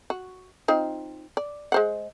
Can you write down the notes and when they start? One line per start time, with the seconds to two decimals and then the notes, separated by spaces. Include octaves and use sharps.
0.10 F#4
0.68 C4 D#4 F4
1.37 D5
1.72 G#3 C5 F#5